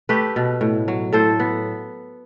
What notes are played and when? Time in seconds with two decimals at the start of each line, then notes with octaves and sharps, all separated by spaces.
0.09 A3 G4 B4
0.36 B2
0.61 A2
0.88 F#3
1.13 A2 A4 C5
1.40 B3